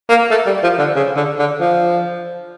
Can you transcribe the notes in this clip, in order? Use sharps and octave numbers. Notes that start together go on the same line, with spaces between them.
A#3
A3
G3
F3
D3
C#3
D3
D3
F3